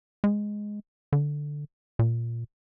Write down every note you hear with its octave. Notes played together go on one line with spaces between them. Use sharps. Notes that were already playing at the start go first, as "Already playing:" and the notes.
G#3
D3
A#2